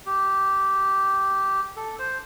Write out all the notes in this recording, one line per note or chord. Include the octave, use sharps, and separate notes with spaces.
G4
A4
C5